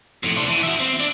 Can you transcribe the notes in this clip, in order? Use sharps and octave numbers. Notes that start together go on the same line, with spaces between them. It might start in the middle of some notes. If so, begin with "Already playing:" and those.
F2 A2
D4 C5
E3
F#4 E5
C4
D4